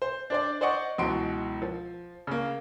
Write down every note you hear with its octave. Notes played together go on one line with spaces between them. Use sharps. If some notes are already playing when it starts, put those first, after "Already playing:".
C5
D4 C5 D5
C5 D5 D#5 F#5 C#6
C#2 B2 E3 F#3 C6 D7
F3
C#3 A#3